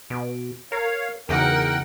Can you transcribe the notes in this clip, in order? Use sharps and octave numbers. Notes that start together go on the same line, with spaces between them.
B2 D7
A#4 C#5 F5
E2 C#3 D#4 F#4 A#4 F#5 G5